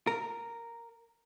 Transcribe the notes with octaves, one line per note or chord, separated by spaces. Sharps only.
A#4